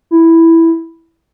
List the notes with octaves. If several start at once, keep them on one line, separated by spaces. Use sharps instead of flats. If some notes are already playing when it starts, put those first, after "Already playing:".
E4